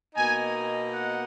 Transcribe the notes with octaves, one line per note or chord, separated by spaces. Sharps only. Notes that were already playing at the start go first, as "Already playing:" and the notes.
B2 A#3 D#4 G#5
F#5